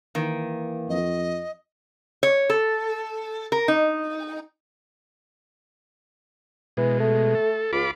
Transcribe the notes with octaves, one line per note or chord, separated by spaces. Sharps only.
D#3 E3 A#3
F2 D#5
C#5
A4
A#4
D#4
B2 E3 G#3
A3
A4
C#2 F4 B5 D6